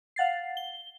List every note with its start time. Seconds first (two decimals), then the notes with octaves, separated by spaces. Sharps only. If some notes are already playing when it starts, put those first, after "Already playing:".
0.16 F5 F#5 A6 C7
0.57 G7